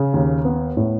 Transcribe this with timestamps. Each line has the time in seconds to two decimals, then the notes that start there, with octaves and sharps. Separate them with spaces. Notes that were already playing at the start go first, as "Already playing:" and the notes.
Already playing: C#3
0.14 D#2
0.45 B3
0.77 A2